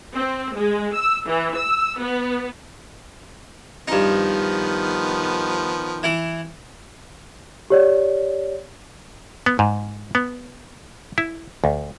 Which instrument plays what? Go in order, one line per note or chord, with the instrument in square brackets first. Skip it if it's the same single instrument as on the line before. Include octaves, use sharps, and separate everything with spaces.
[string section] C4
G#3
E6
E3
E6
B3
[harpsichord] G2 D#4 [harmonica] D#3 F3 B3
[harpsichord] E3 E4
[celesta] G4 C#5 D5
[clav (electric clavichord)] B3
G#2
B3
E4
D2